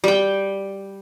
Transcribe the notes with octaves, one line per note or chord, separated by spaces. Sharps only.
G3 G5